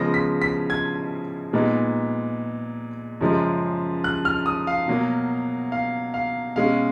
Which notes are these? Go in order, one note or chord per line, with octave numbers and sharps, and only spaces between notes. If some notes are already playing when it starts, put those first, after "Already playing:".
Already playing: C#3 F3 G#3 B3 A#6
B6
B6
G#6
A#2 G#3 B3 D#4
F#2 C#3 F3 G#3
F#6
F6
D#6
F5
B2 F#3 A#3
F5
F5
B2 G#3 C#4 F5